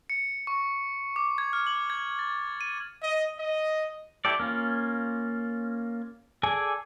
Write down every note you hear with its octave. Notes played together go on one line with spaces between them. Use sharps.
C#7
C#6
D6
G#6
F6
F#7
G#6
A6
D#7
D#5
D#5
E4 G4 A4 D5
A#3 C#4 F4
G#4 A4 D5 G#5